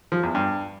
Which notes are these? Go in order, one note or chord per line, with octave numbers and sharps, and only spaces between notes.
F3
E2
G2